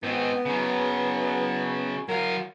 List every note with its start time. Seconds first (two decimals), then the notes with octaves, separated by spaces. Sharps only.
0.03 G#2 B3 C4
0.46 C#3 F#3
2.08 F#3 A#4 F5